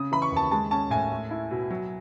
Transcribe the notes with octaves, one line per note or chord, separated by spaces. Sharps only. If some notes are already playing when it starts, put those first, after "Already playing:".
Already playing: C#3 D#6
E3 B5
C#6
D#2 A5
G#3 A5
C#4 A5
A2 G#5
A3
E4
B2
F#3